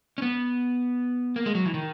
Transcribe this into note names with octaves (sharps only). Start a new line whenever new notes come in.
C#4
B3
A#3
G#3
F#3
E3
D#3